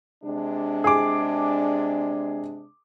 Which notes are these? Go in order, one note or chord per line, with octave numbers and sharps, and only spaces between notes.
C3 G#3 D4
G#4 D6